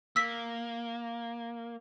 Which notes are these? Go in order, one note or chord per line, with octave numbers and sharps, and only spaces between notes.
A#3 E6 B6